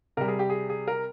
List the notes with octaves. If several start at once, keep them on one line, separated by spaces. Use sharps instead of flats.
C3 G3 A#4
G#4
G4
G#4
G#4
A#4